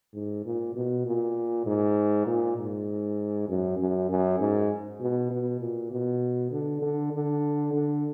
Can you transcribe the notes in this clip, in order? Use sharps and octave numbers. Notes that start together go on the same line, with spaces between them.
G#2
A#2
B2
A#2
G#2
A#2
G#2
F#2
F#2
F#2
G#2
B2
B2
A#2
B2
D3
D3
D3
D3